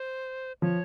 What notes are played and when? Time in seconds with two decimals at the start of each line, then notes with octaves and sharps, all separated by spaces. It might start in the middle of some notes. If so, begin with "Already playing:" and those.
Already playing: C5
0.62 F3 C#5